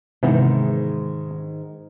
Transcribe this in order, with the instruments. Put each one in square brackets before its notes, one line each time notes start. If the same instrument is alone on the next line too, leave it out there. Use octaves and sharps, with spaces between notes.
[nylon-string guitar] G#2 D#3 G#3 [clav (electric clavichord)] C3 E3 B3